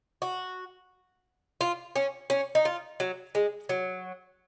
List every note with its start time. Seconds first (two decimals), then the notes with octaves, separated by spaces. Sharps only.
0.22 F#4
1.61 F4
1.96 C#4
2.30 C#4
2.55 D#4
2.65 F4
3.00 F#3
3.35 G#3
3.69 F#3